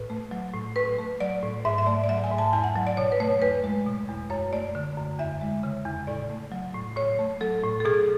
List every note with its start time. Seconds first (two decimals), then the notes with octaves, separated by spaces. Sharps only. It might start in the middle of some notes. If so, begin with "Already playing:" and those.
Already playing: A2 B4
0.10 A3
0.31 F#3
0.54 A2
0.76 A2 B4
0.98 A3
1.20 F#3 D5
1.43 A2
1.65 G#2 E5
1.78 E5
1.86 A3 D5
2.04 D5
2.09 F#3 E5
2.24 G#5
2.31 G#2
2.38 A5
2.53 E2 G#5
2.64 F#5
2.76 F#3
2.87 D5
2.97 B2 C#5
3.12 B4
3.20 A3 C#5
3.42 E2 B4
3.64 G#3
3.87 B2
4.08 E2
4.30 F#2 C#5
4.53 A3 D5
4.75 D3
4.97 F#2
5.19 E2 E5
5.41 G#3
5.63 C#3
5.85 E2
6.07 A2 D5
6.30 A3
6.52 F#3
6.74 A2
6.96 A2 C#5
7.19 A3
7.41 F#3 A4
7.63 A2
7.80 A4
7.85 B2 G#4